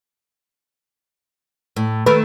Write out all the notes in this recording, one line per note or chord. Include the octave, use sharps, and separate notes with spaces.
A2
D#3 A3 A#4 B4